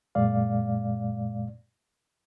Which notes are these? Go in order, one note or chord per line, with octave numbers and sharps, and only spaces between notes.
F#2 A#2 G#3 D5 F5